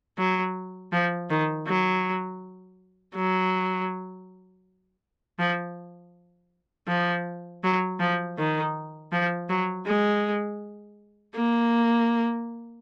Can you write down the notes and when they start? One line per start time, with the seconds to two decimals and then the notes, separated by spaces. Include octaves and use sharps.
0.18 F#3
0.93 F3
1.30 D#3
1.67 F#3
3.15 F#3
5.39 F3
6.88 F3
7.63 F#3
8.00 F3
8.38 D#3
9.12 F3
9.49 F#3
9.86 G#3
11.35 A#3